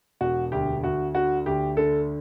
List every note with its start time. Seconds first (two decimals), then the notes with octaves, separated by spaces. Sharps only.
0.21 E1 F#4
0.52 D2 G4
0.83 D2 F#4
1.15 D3 F#4
1.46 D2 G4
1.77 D3 A4